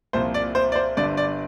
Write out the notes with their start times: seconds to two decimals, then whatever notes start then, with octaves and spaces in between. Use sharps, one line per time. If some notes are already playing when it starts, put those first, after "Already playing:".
0.13 C2 A#2 F3 C5
0.34 D5
0.55 C5
0.72 D5
0.75 C5
0.97 G1 G2 D3 D5
1.17 D5